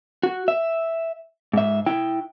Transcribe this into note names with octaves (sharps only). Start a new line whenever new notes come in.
F#4
E5
G#2 E5
E4 G5